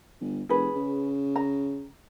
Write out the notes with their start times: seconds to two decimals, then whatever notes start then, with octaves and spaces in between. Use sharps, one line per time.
0.21 G1
0.49 F1 G#4 B4
0.76 C#3
1.36 A#5